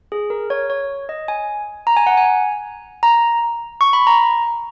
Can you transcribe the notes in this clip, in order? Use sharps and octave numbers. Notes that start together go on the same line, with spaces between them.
G#4
A#4
C#5
C#5
D#5
G#5
A#5
G#5
F#5
G#5
A#5
C#6
B5
A#5